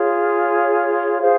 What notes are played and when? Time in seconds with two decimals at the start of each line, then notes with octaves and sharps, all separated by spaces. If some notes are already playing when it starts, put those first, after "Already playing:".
Already playing: F4 G#4 C#5
1.20 F4 G#4 C5 F5